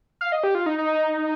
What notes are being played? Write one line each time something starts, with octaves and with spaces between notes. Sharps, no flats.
F5
D#5
G4
F4
D#4
D#4